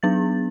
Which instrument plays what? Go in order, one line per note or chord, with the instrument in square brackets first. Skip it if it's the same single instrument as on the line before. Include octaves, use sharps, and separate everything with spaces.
[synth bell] F#3 B3 D4 A6